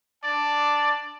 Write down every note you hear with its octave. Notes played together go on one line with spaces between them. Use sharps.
D4 D5 A5